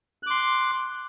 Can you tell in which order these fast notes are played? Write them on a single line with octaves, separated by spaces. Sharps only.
F#6 D6 C6